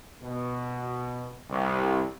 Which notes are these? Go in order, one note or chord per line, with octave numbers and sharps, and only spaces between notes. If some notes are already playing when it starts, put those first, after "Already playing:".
B2
C2